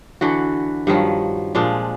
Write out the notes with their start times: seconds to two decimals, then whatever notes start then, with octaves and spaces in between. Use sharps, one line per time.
0.21 D3 E3 F#4
0.87 G2 D#3 F3 F#3
1.55 A#2 F3 G#3 D4